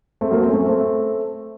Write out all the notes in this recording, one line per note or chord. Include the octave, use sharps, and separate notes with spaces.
A3 C4
F#3 A#3
A3 C4
C#4
A3 C4
A3 C4